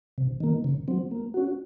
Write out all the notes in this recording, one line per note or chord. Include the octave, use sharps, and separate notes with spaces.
C3
D#3 A#3
C#3
F#3 C4
A#3
C#4 F#4